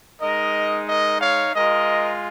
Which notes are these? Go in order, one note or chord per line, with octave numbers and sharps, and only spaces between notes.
G#3 D#4 A#4 D#5
A#4 D#5
C#5 F5
G#3 F4 A#4 D#5